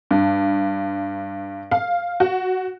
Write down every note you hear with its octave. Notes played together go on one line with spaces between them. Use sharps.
G2
F5
F#4